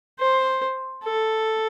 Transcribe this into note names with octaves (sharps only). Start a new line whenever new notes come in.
C5
A4